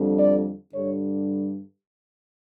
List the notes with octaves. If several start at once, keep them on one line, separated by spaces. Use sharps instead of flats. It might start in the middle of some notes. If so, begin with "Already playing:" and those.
Already playing: F2 D3 G3
D5
G2 D3 G3 C#5